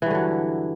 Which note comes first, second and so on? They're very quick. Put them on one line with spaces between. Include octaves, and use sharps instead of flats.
E3 G2 D3 F#3